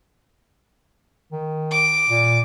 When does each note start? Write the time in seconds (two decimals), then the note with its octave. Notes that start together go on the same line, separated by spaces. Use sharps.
1.32 D#3
1.71 D6
2.09 A#2